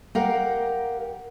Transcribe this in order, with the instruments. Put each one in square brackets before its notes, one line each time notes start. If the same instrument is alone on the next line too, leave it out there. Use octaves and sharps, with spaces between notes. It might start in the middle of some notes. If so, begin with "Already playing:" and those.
[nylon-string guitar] G4 A#4 F5 F#5